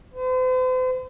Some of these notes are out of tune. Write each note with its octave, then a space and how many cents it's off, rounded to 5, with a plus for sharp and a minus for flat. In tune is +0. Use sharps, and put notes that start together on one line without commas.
C5 -45